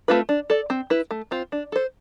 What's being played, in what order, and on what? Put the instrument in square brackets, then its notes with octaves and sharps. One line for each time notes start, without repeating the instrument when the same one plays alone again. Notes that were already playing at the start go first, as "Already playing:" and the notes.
[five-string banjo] A3 C4 F4 B4
D4
A4 D5
C4
E4 B4
A3
C4 F4 C5
D4
A4 C5